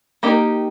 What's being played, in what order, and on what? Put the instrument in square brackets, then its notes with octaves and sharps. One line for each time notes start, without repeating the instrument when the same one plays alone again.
[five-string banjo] A#3 D#4 G4 A#4